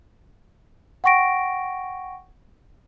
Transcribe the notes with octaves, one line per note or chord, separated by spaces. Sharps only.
F#5 G5 C#6 A#6 D7